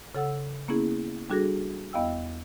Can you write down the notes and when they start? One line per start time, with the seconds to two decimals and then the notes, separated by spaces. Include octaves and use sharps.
0.15 C#3 A4 F#5 E6
0.68 A#3 B3 C#4 E4 G#4
1.30 G3 D4 F#4 G#4 A4 A#6
1.93 E2 B3 D#5 F5 G5 E6